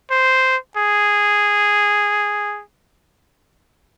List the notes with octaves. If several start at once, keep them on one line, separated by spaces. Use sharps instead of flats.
C5
G#4